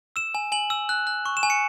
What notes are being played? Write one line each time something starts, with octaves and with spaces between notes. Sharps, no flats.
E6 E7
G#5
G#5 F#7
E6
F#6
F#6
C#6
E7
G#5
C#7